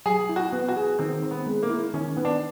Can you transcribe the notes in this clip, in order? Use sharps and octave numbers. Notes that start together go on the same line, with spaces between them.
F#3 G#4
E4
F#4
B3
F#4
G#4
D#3 C4
C4
B3
G#3
A#3
E4
D#3 C#4
B3
D4